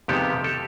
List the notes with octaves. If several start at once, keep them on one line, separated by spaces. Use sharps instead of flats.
F2 C3 D#3 G#3 B3 G4 A4
G4 A4